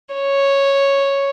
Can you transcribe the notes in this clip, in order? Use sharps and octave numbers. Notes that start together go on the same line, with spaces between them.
C#5